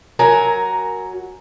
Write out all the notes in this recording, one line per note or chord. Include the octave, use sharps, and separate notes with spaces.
F#3 A#4 G#5